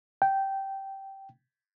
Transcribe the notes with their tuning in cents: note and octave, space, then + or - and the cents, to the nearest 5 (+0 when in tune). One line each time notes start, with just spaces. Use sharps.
G5 -10